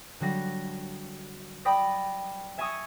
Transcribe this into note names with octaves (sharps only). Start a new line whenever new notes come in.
D3 F#3 G3 A#6
D5 G5 B5 D6 D#6 A#6
E5 G#5 A#5 C#6 D#6